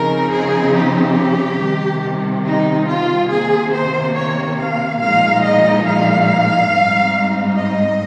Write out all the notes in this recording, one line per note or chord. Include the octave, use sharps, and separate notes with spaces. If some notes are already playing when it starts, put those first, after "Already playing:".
Already playing: C#3 F3 C4 D#4 A#4
G#4
G4
C3 D#3 G3
D#4
F4
C3 D#3 A#3 G#4
C5
C#5
F5
A#2 F3 G#3 D#4 F5
D#5
F5
G#2 G3 C4 D#4
D#5